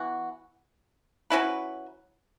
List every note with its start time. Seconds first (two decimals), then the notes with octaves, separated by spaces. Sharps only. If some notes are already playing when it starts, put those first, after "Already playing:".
Already playing: E3 B3 F#4
1.30 F#3 C#4 E4 B4